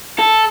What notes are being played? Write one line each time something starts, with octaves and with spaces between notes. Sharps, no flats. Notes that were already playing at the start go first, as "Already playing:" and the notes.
A4